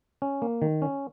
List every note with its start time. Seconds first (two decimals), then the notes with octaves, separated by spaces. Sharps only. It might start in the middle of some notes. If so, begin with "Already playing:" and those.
0.22 C#4
0.42 A#3
0.62 D#3
0.82 C#4